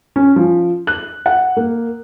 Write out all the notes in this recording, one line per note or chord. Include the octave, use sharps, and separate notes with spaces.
C#4
F3
F#6
F#5
A#3